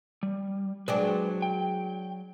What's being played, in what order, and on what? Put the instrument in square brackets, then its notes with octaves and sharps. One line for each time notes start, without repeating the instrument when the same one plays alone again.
[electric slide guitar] G3
[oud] F#3 G#3 D4 [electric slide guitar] B4 C5 G5
[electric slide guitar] G5